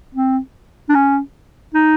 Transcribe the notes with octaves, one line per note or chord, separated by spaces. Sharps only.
C4
D4
C#4
D#4